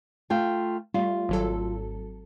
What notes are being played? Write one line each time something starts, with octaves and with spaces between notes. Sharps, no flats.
A3 F4 G5
G3 A3 F4
G#1 F#3 A4